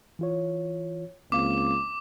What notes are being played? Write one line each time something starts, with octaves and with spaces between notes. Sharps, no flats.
E3 F4 C#5
C#2 A#3 C4 F5 D6